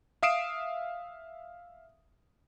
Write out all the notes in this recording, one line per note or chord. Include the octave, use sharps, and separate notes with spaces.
E5 F5 D#6 C7 D7 E7